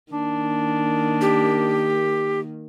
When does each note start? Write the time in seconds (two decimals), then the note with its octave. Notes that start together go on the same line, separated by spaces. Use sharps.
0.12 D#3 A#3 D4
1.21 G4